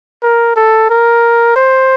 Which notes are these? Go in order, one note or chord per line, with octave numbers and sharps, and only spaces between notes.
A#4
A4
A#4
C5